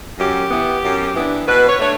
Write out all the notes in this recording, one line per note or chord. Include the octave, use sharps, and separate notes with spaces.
F#2 G4
E3 B3
F#2
E3 B3 D4
B2 B4
C#5
A3 D4 C#5